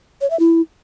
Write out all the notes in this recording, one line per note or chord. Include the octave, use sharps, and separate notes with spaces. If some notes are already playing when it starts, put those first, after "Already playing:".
C#5
E5
E4